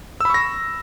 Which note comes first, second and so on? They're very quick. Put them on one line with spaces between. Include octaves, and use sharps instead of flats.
E6 B5 C#6 A#6